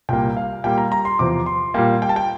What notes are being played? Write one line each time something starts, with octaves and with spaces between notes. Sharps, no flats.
C2 A#2 G3 A#3 G5
F5
A#2 G3 A#3 G5
A#5
A#5
C6
E2 C3 F3 D6
C6
A#2 G3 A#3 G5
G5
A5
G5